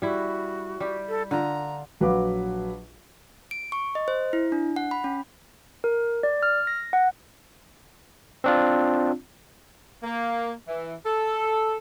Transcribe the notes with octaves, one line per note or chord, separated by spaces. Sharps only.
G3 E4 F#4
G3 G4
A4
D3 F4 A#5
A#1 F#3 B4 F5 F#5 D6
D7
C#6
D#5
C5
E4
D4
F#5
B5
C#4
A#4
D5
F6
A#6
F#5
C4 D4 F4
A#3
E3
A4